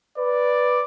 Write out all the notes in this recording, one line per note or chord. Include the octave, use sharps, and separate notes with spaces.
B4 D5